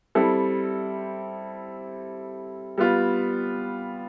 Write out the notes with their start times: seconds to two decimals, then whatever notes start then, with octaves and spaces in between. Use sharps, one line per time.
0.15 G3 C4 E4 A4
2.78 G3 B3 F4